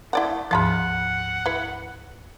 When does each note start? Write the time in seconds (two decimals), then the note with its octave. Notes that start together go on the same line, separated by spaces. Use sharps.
0.13 A3 E4 D5 F#5
0.51 D2 G#2 F3 F5 F#5 A5 B5
1.46 E4 B4